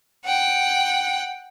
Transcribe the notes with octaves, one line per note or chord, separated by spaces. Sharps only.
F#5 G5